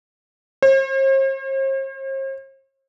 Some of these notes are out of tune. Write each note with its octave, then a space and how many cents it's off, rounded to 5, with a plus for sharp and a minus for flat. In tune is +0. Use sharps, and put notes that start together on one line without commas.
C5 +45